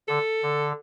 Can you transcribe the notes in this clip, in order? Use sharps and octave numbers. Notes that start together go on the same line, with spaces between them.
D3 A4
D3